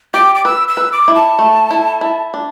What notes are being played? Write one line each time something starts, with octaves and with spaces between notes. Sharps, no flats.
G4 D6
D6
B4 E6
E6
B4
D6
E4
A5
A3
E4
E4
D4